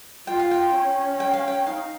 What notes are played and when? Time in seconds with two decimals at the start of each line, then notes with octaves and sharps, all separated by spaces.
0.27 F4 G5
0.39 F5
0.51 G5
0.74 C#4
1.20 G5
1.33 F5
1.48 G5
1.66 D#4 F5